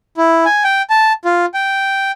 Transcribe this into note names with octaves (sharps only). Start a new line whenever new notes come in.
E4
G#5
G5
A5
F4
G5